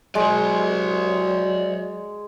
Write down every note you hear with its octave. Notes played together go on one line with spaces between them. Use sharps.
F#3 G#3 C5 D5